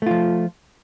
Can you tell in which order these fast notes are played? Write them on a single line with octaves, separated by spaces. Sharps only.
A3 F4 F3